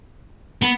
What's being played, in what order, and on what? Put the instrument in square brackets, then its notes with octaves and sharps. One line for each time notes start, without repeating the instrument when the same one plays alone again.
[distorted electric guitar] B3